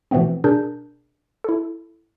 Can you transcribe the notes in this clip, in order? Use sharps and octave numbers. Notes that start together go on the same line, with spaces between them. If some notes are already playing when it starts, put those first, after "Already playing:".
B2 E3 F3 A3 B3 C4
B2 D4 G#4 A#4 G6
E4 A4